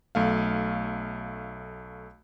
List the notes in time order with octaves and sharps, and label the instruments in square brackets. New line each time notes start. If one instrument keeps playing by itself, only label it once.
[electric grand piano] B1 A3 F5